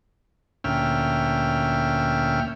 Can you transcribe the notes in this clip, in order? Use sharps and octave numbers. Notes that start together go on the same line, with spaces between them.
D2 A#2 C#4 E5 G5 F6